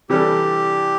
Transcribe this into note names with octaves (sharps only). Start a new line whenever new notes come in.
C3 E3 G3 D4 G4 A4